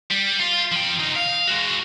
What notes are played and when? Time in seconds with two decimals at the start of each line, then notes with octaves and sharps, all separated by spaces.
0.11 G3
0.39 F4
0.72 F3 G5
1.00 C2 D#4
1.16 F5
1.48 G#3 F#4